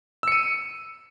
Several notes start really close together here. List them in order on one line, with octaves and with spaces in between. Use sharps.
E6 C#7 D#7